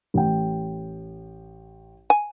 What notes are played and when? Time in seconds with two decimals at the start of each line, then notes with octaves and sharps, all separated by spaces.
0.14 A1 G5
2.10 G#5